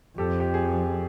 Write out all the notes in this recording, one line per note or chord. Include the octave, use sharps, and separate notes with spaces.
F2 G4 A4
G4
G#4